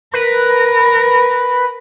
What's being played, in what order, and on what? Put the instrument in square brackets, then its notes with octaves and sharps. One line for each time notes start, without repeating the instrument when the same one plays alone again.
[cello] A#4 [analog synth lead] B4